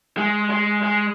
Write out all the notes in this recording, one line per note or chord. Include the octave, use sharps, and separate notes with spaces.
G#3
G#3
G#3